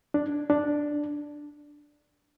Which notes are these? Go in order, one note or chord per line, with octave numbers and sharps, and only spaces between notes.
D4
D4